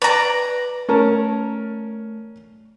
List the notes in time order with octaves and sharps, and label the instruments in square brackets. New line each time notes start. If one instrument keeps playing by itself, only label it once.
[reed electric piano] B4 [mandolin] D5 A#5
[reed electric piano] A3 [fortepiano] C#4 A#4 A5